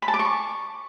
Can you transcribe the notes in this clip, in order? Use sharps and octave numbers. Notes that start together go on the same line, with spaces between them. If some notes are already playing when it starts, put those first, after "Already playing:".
B5
A5
D6
C#6